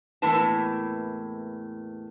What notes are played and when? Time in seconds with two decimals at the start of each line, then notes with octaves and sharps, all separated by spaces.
0.22 E2 A2 A#3 B4 A5